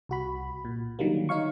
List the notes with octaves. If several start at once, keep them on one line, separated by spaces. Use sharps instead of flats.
C2 F#4 B5
A#2
D3 D#3 F#3 G3 A#3
D#4 C#5 F5 C#6